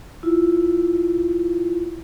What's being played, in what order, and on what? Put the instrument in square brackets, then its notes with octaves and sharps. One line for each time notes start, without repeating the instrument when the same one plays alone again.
[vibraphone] E4 F4